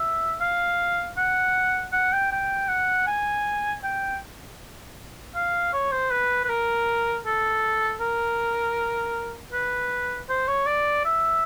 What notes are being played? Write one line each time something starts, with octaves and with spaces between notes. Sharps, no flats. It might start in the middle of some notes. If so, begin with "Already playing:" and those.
Already playing: E5
F5
F#5
F#5
G5
G5
F#5
G#5
G5
F5
C#5
C5
B4
B4
A#4
A4
A#4
B4
C5
C#5
D5
E5